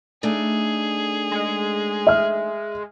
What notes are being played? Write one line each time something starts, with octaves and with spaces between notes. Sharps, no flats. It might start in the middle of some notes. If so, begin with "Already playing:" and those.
A3 D4 D#4 G#4
G#3
E5 F6